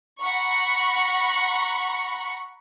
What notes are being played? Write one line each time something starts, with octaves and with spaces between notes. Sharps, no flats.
F#5 A#5 B5 C#6